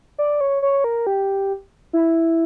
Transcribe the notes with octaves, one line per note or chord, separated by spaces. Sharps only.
D5
C#5
C#5
A#4
G4
E4